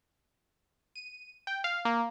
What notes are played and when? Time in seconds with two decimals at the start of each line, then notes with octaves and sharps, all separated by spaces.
0.96 D#7
1.47 G5
1.64 F5
1.85 A#3